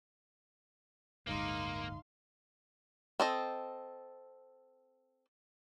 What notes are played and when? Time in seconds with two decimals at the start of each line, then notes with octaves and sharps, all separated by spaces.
1.27 D1 G1 G#3 A#3 D#4 F5 C6
3.20 C4 A4 D#5